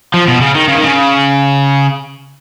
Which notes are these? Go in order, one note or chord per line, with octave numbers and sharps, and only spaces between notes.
F3
B2
C#3
D#3
C#3
D#3
C#3